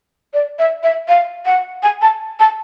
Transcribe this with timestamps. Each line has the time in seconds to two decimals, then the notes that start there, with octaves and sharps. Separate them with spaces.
0.33 D5
0.58 E5
0.82 E5
1.08 F5
1.45 F#5
1.82 G#5
2.01 A5
2.39 A5